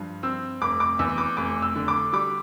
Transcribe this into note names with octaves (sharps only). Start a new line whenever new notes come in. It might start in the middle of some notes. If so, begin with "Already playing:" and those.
Already playing: G2 F3
C4 E6
F1 D6
D6
E2 E6
D6
F1 D6
E6
D3
D6
G3 D6